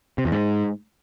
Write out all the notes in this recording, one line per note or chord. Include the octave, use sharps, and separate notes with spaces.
C3
E2
G#2